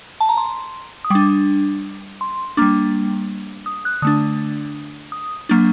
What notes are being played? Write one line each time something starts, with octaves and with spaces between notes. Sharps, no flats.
A5
A#5
C6
D#6
G3 D4 D6
C6
G3 A#3 D4 D6
D#6
F#6
D3 A3 D4 D#6
D#6
F#3 A#3 D4